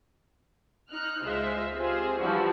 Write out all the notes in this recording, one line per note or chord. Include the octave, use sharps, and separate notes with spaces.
D#4 F6 F#6
C#2 G#3 F4 C5 D#5 E5
C4 F4 G4 G#4 C5
E3 F3 G3 D4 E4 F#4